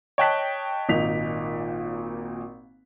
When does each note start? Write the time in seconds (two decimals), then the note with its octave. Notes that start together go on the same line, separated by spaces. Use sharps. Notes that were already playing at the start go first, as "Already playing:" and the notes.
0.18 C#5 D#5 G5 A5 F#6 B6
0.89 G#1 A#2 D#4 B6 F7